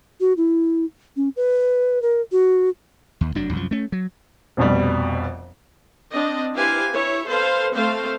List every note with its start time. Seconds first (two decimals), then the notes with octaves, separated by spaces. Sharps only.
0.20 F#4
0.37 E4
1.17 C#4
1.36 B4
2.02 A#4
2.32 F#4
3.21 D#2
3.35 F1 F#2 F#3 D4
3.53 C2 F#2 F3
3.71 A3 C#4
3.92 F#3
4.57 F1 A#1 F2 B2 G3
6.12 C4 D4 D#5
6.54 E4 G4 B4 C5 F5 G#5
6.94 E4 C#5 E5
7.27 A4 B4 C5 F5
7.75 A3 C4 C5 F5